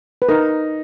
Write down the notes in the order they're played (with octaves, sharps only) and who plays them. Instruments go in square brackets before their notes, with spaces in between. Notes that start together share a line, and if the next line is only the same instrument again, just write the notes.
[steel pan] B4
[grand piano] D#4 [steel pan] A#4